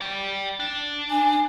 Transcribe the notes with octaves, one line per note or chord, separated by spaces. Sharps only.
D5 G5
D4
G#5